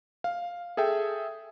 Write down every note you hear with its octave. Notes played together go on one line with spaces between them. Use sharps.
F5
G#4 A4 E5 G5